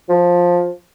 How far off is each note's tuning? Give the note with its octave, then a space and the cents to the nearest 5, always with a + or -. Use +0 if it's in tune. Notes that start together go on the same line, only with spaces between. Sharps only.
F3 +10